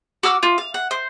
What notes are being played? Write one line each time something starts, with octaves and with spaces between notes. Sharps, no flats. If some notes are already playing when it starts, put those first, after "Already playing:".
F#4 D6 E6 F6
F4
F5
F#5
C5